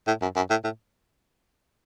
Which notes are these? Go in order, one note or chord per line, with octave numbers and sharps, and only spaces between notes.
A2
F#2
F#2
A2
A2